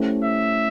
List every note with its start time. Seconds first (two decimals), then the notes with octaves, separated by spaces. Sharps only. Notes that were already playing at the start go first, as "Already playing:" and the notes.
Already playing: A3 C#4 E4 G4 C5
0.24 E5